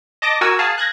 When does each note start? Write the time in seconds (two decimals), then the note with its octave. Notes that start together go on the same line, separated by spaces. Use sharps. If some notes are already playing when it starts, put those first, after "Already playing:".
0.22 D#5 A5 D6 A#6
0.41 F#4 A#4 G#5 E6
0.59 G#4 F5 A5
0.78 F#6 G#6 A#6